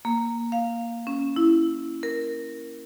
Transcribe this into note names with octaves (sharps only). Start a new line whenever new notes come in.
A#3
F5
C#4
E4
A#4